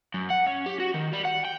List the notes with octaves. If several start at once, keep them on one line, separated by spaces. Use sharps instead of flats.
F#2
F#5
C#4
G4
F#4
D#3
G3
F#5
G5